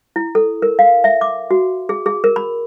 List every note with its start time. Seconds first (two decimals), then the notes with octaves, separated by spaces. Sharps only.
0.16 E4
0.35 A4
0.62 A#4
0.79 F5
1.04 E5
1.21 D6
1.51 F#4
1.89 G#4
2.06 G#4
2.24 A#4
2.36 B5